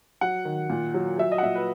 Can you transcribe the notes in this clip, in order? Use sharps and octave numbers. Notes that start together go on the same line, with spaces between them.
F#3 F#5
D#3
A#2
F#3
F#3 E5
D#5
F#5
A#2 E5
B4